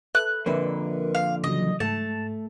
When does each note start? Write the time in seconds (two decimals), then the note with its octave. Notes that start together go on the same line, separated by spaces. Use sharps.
0.15 A4 B4 E5 F#6
0.46 F2 A#2 D3 A#4 B4 E5
1.15 F5
1.44 C#3 E3 F#3 D#5
1.80 G#2 A3 A5